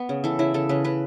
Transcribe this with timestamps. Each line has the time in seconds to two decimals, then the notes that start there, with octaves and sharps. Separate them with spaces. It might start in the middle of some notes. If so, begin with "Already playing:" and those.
Already playing: B3 B4
0.09 C#3
0.24 E3 A4
0.39 C#3 E4
0.54 C#3 A4
0.69 C#3 B4
0.84 C#3 B4